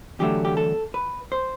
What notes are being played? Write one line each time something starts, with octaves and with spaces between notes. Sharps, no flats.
E2 D3 F#3 A3 G4
G4
A4
B4
C5